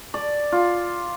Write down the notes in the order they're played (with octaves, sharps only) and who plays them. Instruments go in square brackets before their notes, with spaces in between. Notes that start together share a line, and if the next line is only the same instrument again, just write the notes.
[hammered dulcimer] D5
F4